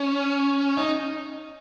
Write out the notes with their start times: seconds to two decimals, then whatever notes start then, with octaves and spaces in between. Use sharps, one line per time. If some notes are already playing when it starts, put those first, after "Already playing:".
Already playing: C#4
0.77 D#4